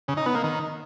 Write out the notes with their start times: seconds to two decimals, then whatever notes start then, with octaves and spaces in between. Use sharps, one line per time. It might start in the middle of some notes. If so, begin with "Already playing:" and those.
0.08 C#3
0.17 D#4
0.26 B3
0.35 A#3
0.44 D#3